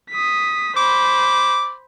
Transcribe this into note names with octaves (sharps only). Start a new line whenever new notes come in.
D#6 B6
C5 B5 D6